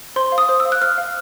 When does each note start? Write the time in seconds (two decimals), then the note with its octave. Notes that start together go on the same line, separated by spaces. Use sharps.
0.16 C5 C6
0.32 F5
0.38 D#6
0.49 C5
0.60 E6
0.65 F5
0.72 F#6
0.81 C5 F6
0.98 F5